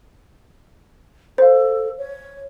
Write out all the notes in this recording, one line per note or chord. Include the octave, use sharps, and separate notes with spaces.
A4 C5 F5
C#5